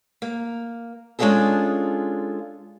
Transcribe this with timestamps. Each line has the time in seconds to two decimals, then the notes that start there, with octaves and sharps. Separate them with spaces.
0.22 A#3
1.19 G#3 C#4 D4 F4 G#4 A4